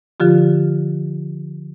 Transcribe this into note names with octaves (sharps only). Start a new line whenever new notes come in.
D3 F3 F4 G4